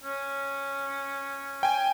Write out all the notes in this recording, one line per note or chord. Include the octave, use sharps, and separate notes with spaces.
C#4
G5 G#5